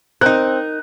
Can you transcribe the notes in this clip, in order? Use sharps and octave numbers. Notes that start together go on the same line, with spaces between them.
C4 D#4 A#4 F#6